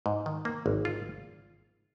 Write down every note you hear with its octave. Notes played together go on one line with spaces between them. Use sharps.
G#2
D#3
A#3
G#1
F4